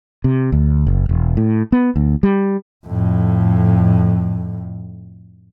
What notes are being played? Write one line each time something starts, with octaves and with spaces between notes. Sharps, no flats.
C3
D2
F#1
E1
A2
B3
D2
G3
F2 A2